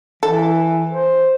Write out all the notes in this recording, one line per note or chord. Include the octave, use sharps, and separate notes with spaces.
E3 A4
C5